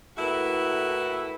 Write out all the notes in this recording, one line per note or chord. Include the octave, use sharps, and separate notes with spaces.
A2 A#3 E4 F#4 A4 B4